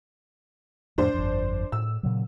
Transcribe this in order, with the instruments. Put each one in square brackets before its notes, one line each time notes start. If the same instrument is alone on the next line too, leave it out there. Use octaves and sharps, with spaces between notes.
[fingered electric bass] F2 A2 [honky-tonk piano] D4 C5
[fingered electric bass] G1 F2
[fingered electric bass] A2 [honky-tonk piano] E6
[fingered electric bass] A#2 C#3 F#3